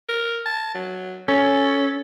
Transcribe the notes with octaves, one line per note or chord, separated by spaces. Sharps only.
A#4
A5
F#3
C#4 A4